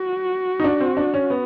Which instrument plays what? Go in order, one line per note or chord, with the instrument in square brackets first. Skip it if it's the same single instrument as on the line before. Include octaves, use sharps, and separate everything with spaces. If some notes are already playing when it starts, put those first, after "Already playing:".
Already playing: [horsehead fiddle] F#4
[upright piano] D#4
D4
C4
D4
C#4
B3